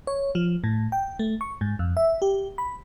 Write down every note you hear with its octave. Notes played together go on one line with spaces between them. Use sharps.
C#5
F3
A2
G5
A3
C#6
G#2
F2
E5
G4
B5